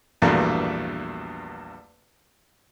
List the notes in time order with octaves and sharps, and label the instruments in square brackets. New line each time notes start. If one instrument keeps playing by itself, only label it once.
[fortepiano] A#1 E2 G2 B2 A3 A#3